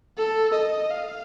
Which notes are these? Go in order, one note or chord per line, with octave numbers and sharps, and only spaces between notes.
A4
D#5
F5